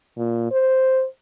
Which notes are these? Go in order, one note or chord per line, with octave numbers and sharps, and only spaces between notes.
A#2
C5